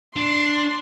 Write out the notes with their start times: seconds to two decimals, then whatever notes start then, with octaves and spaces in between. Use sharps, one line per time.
0.16 D4 C6